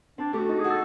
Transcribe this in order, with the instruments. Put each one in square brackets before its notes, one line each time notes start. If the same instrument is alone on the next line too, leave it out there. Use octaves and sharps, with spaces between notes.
[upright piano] C4 [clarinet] D4
[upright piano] A3 [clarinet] G4
[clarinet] F#4
[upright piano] D#4
[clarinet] G#4
[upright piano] F#4
[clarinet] A4